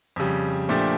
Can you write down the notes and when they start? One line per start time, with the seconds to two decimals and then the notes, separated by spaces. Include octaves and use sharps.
0.16 F2 C#3 G3
0.69 A#2 F3 A3 D4 G4